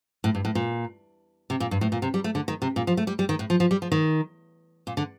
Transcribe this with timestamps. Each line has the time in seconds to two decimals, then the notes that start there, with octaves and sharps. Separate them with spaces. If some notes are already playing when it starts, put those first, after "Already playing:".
0.24 A2
0.35 G2
0.45 A2
0.55 A#2
1.50 C3
1.60 A#2
1.71 G2
1.81 A2
1.92 A#2
2.02 C3
2.14 G3
2.24 A3
2.35 D3
2.48 D#3
2.62 C3
2.76 A#2
2.87 F3
2.97 A3
3.07 G3
3.19 G3
3.29 D#3
3.39 A2
3.50 F3
3.60 F3
3.71 G3
3.82 F3
3.92 D#3
4.87 A#2
4.97 D3